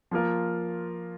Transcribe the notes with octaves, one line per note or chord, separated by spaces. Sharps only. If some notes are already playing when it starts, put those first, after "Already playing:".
F3 A#3 F4 A#4